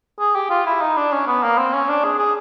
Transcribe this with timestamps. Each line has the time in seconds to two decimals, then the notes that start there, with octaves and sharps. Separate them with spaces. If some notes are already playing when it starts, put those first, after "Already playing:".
0.20 G#4
0.36 G4
0.50 F4
0.66 E4
0.82 D#4
0.97 D4
1.12 C#4
1.27 B3
1.43 A#3
1.58 C4
1.73 C#4
1.89 D4
2.04 G#4
2.19 G#4